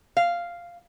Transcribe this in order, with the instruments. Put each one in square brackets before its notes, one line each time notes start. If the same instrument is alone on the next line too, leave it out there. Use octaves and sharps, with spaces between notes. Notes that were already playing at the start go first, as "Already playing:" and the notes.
[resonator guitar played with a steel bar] F5